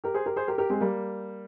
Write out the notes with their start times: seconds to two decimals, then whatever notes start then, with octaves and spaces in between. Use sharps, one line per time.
0.04 G4 A#4
0.14 G#4 C5
0.26 G4 A#4
0.36 G#4 C5
0.48 G4 A#4
0.58 G4 A#4
0.70 G#3 C4
0.80 G3 A#3